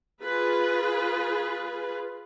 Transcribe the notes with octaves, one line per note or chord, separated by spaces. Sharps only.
F4 G#4 B4